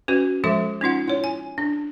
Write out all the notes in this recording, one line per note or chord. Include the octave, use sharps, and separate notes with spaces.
C#4 F#4 B4
F3 G#3 A4 E5 D6
C#4 D#4 F4 F#5
E4 C#5
G#5
D4